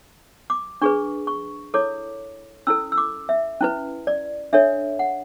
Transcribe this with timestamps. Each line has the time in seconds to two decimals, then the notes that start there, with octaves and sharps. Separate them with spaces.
0.50 D6
0.82 D4 G#4 B4 C#6
1.27 C#6
1.74 E4 A4 C#5 D6
2.67 C#4 E4 A4 E6
2.92 E6
2.98 D6
3.29 E5
3.61 C#4 E4 B4
4.07 D5
4.53 D4 A4 C#5 E5
4.99 F#5